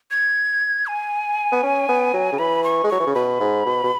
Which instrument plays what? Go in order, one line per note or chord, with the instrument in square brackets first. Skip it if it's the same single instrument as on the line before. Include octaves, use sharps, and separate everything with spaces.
[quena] G#6
G#5
[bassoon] B3
C#4
B3
F#3
C#3
[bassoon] E3 [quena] B5
[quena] C#6
[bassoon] G#3
[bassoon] F#3 [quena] C#6
[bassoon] E3
C#3
[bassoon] B2 [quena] B5
[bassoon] G#2
B2
B2